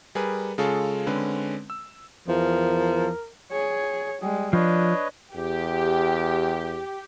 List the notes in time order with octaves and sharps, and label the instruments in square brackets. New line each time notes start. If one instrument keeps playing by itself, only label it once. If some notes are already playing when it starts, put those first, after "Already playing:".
[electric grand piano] G3 G#4 A#4 B4
C#3 G#3 F4 G#4 A4 C#5
D3 G#3 C4 C#4 B4
E6
[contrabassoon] E2 [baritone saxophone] F3 [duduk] A#4
[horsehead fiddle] G#4 C#5
[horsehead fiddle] G3 G#3 [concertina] G#4
[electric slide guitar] F3 [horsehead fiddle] D4 [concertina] B4 C#5 D#5
[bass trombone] E2 [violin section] G4